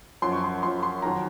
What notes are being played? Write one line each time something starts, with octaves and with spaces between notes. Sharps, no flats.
F#2 F3 C6
C#6
C6
F#2 F3 C6
C6
F2 D#3 F#3 A#5